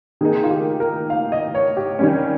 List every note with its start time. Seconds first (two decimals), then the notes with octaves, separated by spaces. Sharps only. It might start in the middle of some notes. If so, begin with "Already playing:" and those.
0.21 D#3 A#3 D#4 G#4
0.43 F4
0.51 G4
0.80 A#4
1.10 F5
1.32 D#5
1.55 C#5
1.77 G4
1.99 D#3 G3 C#4